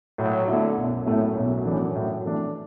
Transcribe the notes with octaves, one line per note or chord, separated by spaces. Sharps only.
A2 F#3
D3 E4
A3
B1 F#2
A2 A3 E4
B1
A2 E3 D4
A2
E3 A3 D4